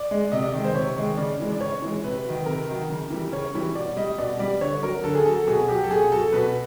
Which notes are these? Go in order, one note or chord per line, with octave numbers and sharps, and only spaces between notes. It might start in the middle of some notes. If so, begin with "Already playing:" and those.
Already playing: D5
G#3
C3 D#5
D5
D#3 G#3
C5
C3 C#5
D#3 G#3
C#3 D5
E3 G#3
D5
C#3 C#5
E3 G#3
C3 B4
D#3 F#3
C3 A#4
D#3 F#3
C#3
E3 G3
C#3 C#5
E3 G3
B2 D5
G3 D#5
B2 D5
G3 D5
D3 C#5
F#3 A#4
D3 A4
G#4
F#3 A4
B2 G#4
F#3 G4
A4
B2 G#4
F#3 A4
B2 B4